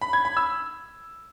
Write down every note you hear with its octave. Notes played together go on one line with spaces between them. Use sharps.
B5
G#6
B5
E6